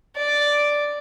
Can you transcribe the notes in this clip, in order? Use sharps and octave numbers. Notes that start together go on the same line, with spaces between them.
D5